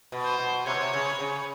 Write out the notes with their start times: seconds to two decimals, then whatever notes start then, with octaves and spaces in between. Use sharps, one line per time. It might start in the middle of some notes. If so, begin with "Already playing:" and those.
0.12 B2
0.25 C5
0.38 B2
0.66 C3 C#5
0.74 B2
0.81 C3
0.93 C#3
1.20 C#3